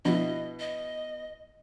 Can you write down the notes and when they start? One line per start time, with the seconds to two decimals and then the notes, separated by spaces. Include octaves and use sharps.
0.05 B2 F3 D4 E4 D#5
0.60 D#5